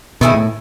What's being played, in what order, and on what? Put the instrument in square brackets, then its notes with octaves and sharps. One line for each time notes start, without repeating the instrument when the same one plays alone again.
[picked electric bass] B2 [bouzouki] D#3 A3 E4 G#4
[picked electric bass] A2